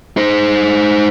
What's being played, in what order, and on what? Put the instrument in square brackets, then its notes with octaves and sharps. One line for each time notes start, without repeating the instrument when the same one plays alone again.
[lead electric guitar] D#4 C5